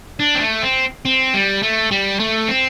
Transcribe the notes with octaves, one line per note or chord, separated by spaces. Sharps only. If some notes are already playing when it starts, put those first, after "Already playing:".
D4
C4
A3
C4
C4
G3
A3
G3
A3
C4